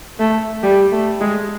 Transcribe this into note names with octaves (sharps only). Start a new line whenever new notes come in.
A3
G3
A3
G#3